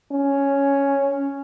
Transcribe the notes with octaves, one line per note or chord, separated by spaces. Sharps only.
C#4